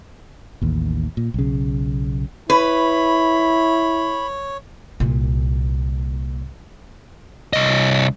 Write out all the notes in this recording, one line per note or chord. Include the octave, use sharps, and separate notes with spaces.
A1 D#2
A#2
B1 C#3
E4 B4 C#5 B5
C2 A#2
C2 D#5